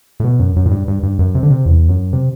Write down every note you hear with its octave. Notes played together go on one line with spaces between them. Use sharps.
A2
B2
F#2
F#2
A2
G2
G2
G2
F#2
C3
D3
C3
E2
F#2
C3